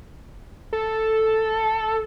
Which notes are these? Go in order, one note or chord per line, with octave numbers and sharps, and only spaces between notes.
A4